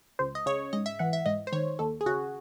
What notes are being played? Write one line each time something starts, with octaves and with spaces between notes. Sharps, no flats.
C#2 C5
D#5
C#3 C#5
G#2 D#5
E5
E3 F#5
E5
G#2 D#5
C5
D#3 C#5
D#2 A4
G#4
C#3 F#4